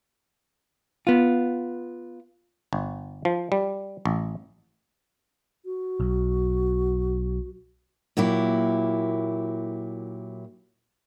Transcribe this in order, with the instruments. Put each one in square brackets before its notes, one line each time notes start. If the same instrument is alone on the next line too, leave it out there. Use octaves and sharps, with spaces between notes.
[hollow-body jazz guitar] B3 F4
[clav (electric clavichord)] G1
F3
G3
A1
[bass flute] F#4
[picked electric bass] B1
[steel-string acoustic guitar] A#2 F#3 A#3 E4 G4